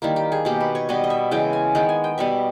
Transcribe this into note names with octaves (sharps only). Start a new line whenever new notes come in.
D#3 G3 A#3 E4
G4
G#4
B2 A#3 G4
B4
C#5
B2 G3 B3 D#5
D#5
E5
C#3 E3 G#3 G5
G#5
D#3 G#3 B3 G5
G#5
G5
B2 G3 B3 E5